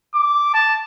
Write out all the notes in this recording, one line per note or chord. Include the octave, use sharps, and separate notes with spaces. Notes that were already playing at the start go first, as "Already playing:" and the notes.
D6
A5